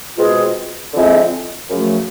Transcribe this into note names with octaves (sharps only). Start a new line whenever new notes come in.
B2 G#3 C4 F4 G#4
D3 F3 G#3 C4 E4
F#2 C#3 F3 A3